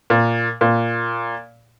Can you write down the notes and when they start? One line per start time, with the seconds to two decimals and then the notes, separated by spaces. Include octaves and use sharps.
0.10 A#2
0.61 A#2